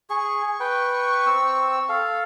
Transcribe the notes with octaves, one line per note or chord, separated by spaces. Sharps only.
G#4 C#6
B4 G5
C4 E6
A4 F5